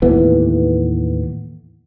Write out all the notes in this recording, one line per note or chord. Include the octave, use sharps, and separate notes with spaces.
D#2 A2 E3 B3